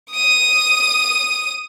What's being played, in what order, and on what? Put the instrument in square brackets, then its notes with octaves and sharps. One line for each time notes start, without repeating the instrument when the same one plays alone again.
[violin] D#6 D#7